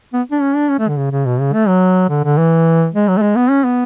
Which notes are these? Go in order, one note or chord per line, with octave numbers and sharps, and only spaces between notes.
B3
D4
C#4
D4
C#4
A3
D3
C#3
C#3
B2
C#3
A3
F#3
D3
D3
E3
G#3
F#3
A3
G#3
B3
C#4
B3